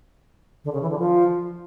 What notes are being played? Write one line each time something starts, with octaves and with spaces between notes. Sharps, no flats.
D3
C#3
E3
D3
F3